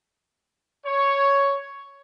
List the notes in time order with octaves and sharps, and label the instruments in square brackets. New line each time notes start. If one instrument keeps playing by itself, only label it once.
[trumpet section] C#5